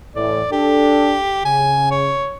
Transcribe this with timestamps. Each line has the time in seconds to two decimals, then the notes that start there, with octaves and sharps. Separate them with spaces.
0.16 A2 E3 D5
0.52 D4 G4 A4
1.45 C#3 G#5
1.91 C#5